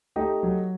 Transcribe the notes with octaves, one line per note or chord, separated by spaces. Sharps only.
A3 D#4 G4
F#3